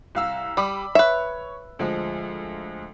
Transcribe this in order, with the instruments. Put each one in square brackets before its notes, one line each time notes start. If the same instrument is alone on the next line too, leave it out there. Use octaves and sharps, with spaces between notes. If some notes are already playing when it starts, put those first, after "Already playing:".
[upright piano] C2 F5 E6
[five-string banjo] G3 [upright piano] B5 D6
[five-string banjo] B4 E5 [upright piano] C#5
[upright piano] D2 F3 G#3